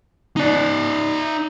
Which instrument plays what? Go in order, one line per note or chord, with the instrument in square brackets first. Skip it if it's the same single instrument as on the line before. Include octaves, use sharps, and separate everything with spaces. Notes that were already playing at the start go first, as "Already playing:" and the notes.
[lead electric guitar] D#4 D5